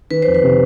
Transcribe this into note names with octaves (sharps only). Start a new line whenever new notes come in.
D#3 B4
F2 C5
B4
C3